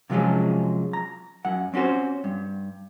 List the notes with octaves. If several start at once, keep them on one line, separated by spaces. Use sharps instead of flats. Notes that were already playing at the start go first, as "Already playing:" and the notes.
C3 F3 F#3 G#3 C#4
A#5
F#2 F#5
C4 C#4 F4 F#4 C5
G2